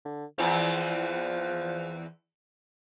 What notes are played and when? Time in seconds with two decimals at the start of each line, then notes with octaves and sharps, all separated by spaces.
0.05 D3
0.38 E2 E3 F3 C4